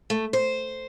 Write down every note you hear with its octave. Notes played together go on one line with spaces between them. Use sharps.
A3
C5